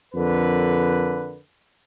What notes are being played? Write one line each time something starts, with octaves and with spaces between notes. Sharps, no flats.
F2 D3 A#4 B4